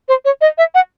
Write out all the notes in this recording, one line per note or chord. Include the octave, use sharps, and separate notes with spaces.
C5
C#5
D#5
E5
F#5